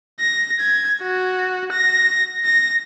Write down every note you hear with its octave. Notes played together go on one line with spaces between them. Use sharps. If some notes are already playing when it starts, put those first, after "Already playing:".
A#6
G#6
F#4
A#6
A#6